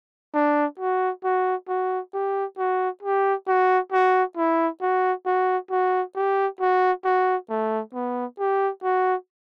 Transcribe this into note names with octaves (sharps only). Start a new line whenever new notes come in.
D4
F#4
F#4
F#4
G4
F#4
G4
F#4
F#4
E4
F#4
F#4
F#4
G4
F#4
F#4
A3
B3
G4
F#4